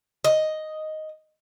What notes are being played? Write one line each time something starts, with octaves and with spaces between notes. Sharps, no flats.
D#5